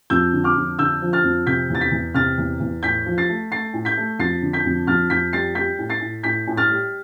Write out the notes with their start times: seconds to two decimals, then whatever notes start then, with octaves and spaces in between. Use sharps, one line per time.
0.10 F2 E6 G6
0.33 D3
0.44 D6 F6
0.56 F2
0.79 D3 E6 G6
1.02 F3
1.13 F6 A6
1.24 F2
1.46 C3 G6 B6
1.70 E2
1.75 A6
1.81 G6 B6
1.92 E2
2.14 C3 F6 A6
2.38 E2
2.60 E2
2.83 A2 G6 B6
3.06 F3
3.18 A6 C7
3.29 A3
3.52 A3 A6 C7
3.74 A2
3.85 G6 B6
3.97 A3
4.19 F2 A6 C7
4.42 D3
4.53 G6 B6
4.65 F2
4.87 F2 F6 A6
5.10 F2 G6 B6
5.33 G3 A6 C7
5.55 G3 G6 B6
5.79 A2
5.90 A6 C7
6.01 A2
6.23 A2 G6 B6
6.47 A2
6.57 F6 A6
6.70 G3